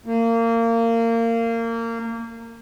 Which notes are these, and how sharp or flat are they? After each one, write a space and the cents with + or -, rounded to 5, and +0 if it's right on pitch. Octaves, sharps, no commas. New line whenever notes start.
A#3 -25